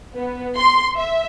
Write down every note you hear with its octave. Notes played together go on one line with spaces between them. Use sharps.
B3
C6
E5